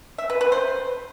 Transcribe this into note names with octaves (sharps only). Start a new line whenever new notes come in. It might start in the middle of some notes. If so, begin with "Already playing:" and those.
E5
B4
B4
C5